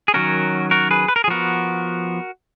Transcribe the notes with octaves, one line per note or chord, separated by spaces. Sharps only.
G#4
D#3 F#3 C#4 F#4 A#4
F#4 A#4
G#4 B4
B4
A#4
G#4
F3 B3 F#4 A#4